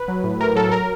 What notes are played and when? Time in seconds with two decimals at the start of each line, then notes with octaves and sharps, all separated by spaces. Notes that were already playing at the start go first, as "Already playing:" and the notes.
Already playing: B4
0.08 F#3
0.24 A2
0.40 A2 A#4
0.56 F#3 A4
0.72 F#3 A#4